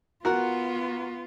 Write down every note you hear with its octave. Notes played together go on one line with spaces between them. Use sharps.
B3 F4 F#4 A#4 F#5